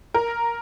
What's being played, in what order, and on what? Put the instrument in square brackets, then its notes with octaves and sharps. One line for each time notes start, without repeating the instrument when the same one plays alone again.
[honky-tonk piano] A#4